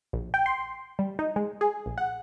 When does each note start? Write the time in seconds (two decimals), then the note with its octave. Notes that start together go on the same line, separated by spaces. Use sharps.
0.13 A#1
0.34 G5
0.46 C6
0.99 G3
1.19 D#4
1.36 G#3
1.61 G#4
1.86 A#1
1.98 F#5